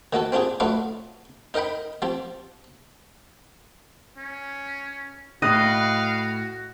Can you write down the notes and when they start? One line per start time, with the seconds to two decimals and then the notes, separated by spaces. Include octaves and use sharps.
0.13 D#3 A#3 F#4 A4
0.32 C4 D4 F4 G4 G#4
0.60 F#3 A3 D4 F4 B4 F5
1.54 D#4 A#4 D#5 G5 B5
2.02 F3 C4 G4
4.17 C#4
5.42 A2 F#4 B4 D#5 F5 F#6